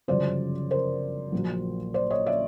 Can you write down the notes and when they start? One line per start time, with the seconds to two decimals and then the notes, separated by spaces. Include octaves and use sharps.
0.08 G1 F#2 C#3 F3 C5 D5
0.71 A#4 C5
1.32 A#1 A#2 F#3
1.94 C5 D5
2.10 C#5 D#5
2.26 D5 E5